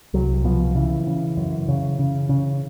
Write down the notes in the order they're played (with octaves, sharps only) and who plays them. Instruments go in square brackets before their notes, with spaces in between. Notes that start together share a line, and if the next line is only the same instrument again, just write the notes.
[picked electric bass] C2 F#3
B2 F3
C#3 E3
C#3
F#2
C#3
C#3
C#3